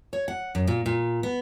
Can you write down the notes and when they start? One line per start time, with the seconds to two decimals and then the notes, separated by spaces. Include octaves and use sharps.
0.13 C#5
0.28 F#5
0.55 F#2
0.67 A#2
0.86 A#2
1.23 B3